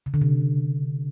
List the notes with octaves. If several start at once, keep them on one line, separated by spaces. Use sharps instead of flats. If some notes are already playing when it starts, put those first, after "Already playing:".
C#3
D3
C3